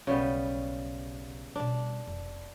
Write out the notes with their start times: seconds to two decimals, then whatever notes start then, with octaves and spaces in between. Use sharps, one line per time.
0.07 B1 C#3 G3 B3
1.56 B2 G3 D4
2.07 F1